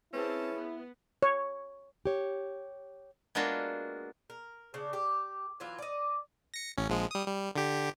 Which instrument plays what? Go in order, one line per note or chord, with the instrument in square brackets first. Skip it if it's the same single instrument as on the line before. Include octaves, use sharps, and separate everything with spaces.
[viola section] C4 A5 [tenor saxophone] C#4 [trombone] E4 [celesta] G#4 B4
[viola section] B3
[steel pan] C#5
[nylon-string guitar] G4 C#5
[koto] G#3 A#3 B3 D4 F4 F#4
[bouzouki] A#4
C#3 D4
G4
E3 F#3 F4 E5
D5 D#5
[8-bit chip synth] A#6 C#7
A1 C#4
A#1 F3 G#3
G3 D#6
G3
D3 G4